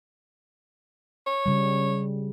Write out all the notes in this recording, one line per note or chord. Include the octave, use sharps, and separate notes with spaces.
C#5
C#3 G3